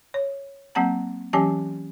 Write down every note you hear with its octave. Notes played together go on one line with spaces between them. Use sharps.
C#5
F#3 A#3 C4 F#5 A5 A#5
E3 F#3 C#4 G4 G#5 A5